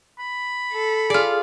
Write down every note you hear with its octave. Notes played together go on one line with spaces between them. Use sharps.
B5
A4
F4 G#4 D5 F6